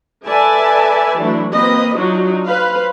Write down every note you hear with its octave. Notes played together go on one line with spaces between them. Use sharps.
A4 B4 D5 E5 G#5 A5
E3 F#3 A3 D4 E4
A#3 C4 B4 D#5
F#3 D4 D#4 F4 F#4
B4 C5 F5